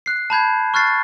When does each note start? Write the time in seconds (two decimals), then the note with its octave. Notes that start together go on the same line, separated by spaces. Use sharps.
0.06 F#6 C7
0.30 A5 B5 G6 G#6
0.74 C#6 F6 F#6 G#6 A6 C7